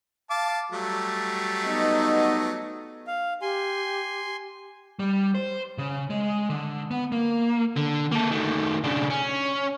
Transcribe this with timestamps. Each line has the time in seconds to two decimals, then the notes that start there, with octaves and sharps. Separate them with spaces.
0.30 F5 A5 D6
0.72 F#3 G3 A3
1.65 B3 D#4 D#5
3.07 F5
3.42 G4 G#5 C6
4.99 G3
5.35 C5
5.78 C#3
6.10 G#3
6.50 D3
6.91 B3
7.12 A#3
7.77 D3
8.12 A#3 A4
8.31 D#3 A3
8.84 C#3 D4
9.10 C#4